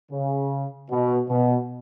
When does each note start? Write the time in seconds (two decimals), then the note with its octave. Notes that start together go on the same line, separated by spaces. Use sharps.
0.12 C#3
0.91 B2
1.29 B2